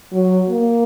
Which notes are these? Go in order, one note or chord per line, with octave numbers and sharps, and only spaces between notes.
F#3
A#3